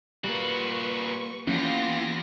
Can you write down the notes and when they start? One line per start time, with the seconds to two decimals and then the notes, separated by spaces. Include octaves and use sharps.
0.24 A#2 G3 A#3 F#4 B4 C#6
1.47 E2 E3 F3 A#3 C#4 F4 G4 A#6